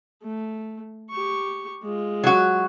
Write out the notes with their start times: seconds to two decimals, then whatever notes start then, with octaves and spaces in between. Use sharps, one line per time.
0.23 A3
1.10 G4 C#6
1.83 G#3 F4
2.24 F#3 F#4